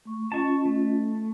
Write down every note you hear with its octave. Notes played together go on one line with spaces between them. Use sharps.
A3 C#6
C#4 F4 D#5 A5 C#6
A3